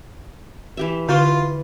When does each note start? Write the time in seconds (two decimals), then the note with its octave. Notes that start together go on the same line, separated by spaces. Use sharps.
0.77 E3 G4 E5
1.09 D3 E3 F4 F#4 B4 C5